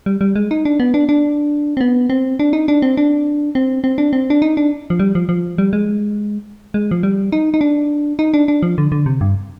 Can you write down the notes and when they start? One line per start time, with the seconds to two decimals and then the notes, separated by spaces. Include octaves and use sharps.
0.06 G3
0.21 G3
0.36 G#3
0.51 D#4
0.65 D4
0.80 B3
0.94 D4
1.09 D4
1.77 C4
1.81 B3
2.10 C4
2.39 D4
2.53 D#4
2.68 D4
2.82 C4
2.97 D4
3.55 C4
3.84 C4
3.98 D4
4.13 C4
4.30 D4
4.42 D#4
4.57 D4
4.90 F3
4.99 G3
5.15 F3
5.29 F3
5.58 G3
5.73 G#3
6.74 G#3
6.91 F3
7.03 G3
7.32 D#4
7.54 D#4
7.61 D4
8.19 D#4
8.34 D4
8.48 D4
8.63 F3
8.78 D3
8.92 D3
9.06 C3
9.21 G2